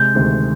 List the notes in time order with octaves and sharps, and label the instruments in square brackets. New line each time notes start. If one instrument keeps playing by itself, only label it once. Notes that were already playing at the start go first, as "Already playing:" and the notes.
Already playing: [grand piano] C3 G#3 [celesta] G6
[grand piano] D2 C3 D#3 G#3